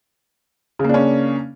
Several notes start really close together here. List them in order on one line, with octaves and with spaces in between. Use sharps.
C#3 A#3 D4 C#4